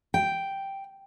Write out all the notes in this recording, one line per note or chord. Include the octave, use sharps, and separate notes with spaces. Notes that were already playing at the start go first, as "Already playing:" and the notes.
G5